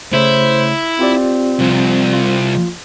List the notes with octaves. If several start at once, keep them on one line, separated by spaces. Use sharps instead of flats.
C#3 A3 E4 C5 C#5
C4 F4 G4 D5
C2 F3 F4
F4